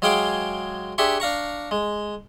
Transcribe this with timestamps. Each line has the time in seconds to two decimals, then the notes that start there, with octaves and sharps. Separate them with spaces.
0.02 F#3 G#3 G#4 F5 G5 D6
0.98 D4 G4 G#4 E5 C6 C#6
1.20 D4 F5 A#5 C#6
1.71 G#3